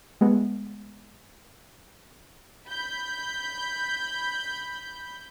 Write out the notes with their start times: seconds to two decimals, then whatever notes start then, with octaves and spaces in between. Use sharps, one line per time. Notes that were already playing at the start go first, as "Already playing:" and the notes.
0.21 G#3 A3 B3
2.69 B5 G6